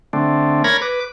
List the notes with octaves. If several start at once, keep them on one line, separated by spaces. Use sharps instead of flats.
D3 A3 C4 D4
A#4 C#5 B5 G#6 A#6
B4 D6